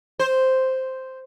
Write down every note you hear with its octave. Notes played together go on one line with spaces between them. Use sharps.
C5